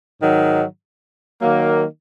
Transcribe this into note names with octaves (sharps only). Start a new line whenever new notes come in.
G#2 D#3 F#3
D#3 F#3 A#3